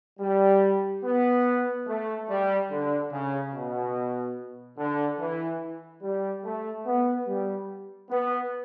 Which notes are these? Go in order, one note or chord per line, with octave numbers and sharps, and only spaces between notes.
G3
B3
A3
G3
D3
C#3
B2
D3
E3
G3
A3
B3
G3
B3